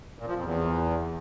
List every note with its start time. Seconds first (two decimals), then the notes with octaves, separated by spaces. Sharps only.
0.19 A#2
0.27 F3
0.36 F2
0.44 E2